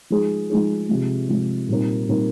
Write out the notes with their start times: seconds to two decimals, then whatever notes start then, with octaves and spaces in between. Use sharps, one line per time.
0.10 F3 G#3 D#4 G#4
0.50 F3 G#3 D#4 G#4
0.89 C3 F3 G#3
1.29 C3 F3 G#3
1.69 A#2 G3 C4 D#4 A#4
2.08 A#2 G3 C4 D#4 A#4